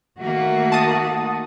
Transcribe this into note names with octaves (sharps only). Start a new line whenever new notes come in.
D#3 A3 A#3 F#4
A5 D#6